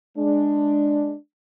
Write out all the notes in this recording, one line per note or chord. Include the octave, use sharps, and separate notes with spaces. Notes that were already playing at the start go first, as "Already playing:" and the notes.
G#3 D4